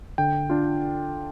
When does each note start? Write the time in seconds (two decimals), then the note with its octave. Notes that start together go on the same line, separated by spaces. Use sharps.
0.18 D3 G5
0.50 D4 F4